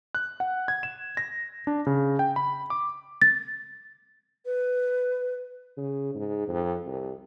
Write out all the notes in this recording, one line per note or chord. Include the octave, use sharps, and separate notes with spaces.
F#6
F#5
G#6
E7
A#6
D4
C#3
G5
B5
D6
A6
B4
C#3
G#2
F2
C2